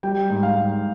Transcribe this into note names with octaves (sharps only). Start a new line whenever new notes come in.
G3 G5
G#2
F5
G#2